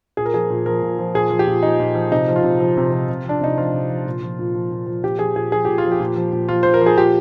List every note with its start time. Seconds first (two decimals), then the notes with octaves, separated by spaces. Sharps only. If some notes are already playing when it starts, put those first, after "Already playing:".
0.17 A#2 G#4
0.26 A#4
0.34 F3 G#4
0.50 A#2
0.66 F3 A#4
0.82 A#2
0.99 F3
1.15 A#2 G#4
1.30 F3
1.39 G4
1.47 A#2
1.63 F3 D#4
1.80 A#2
1.95 F3
2.11 C3 D#4
2.28 F3
2.36 F4
2.44 C3
2.60 F3
2.77 C3
2.93 F3
3.09 C3
3.25 F3 D4
3.41 C3 D#4
3.57 F3 F4
3.74 C3
3.90 F3
4.06 A#2
4.23 F3
4.39 A#2
4.55 F3
4.71 A#2
4.86 F3
5.03 A#2 G4
5.19 F3 G#4
5.36 A#2 G#4
5.52 F3 G#4
5.65 A#2 G4
5.78 F4
5.84 F3
5.92 G4
6.00 A#2
6.16 F3
6.32 A#2
6.48 F3 F4
6.63 A#2 C5
6.74 A#4
6.81 F3 G#4
6.97 A#2 G4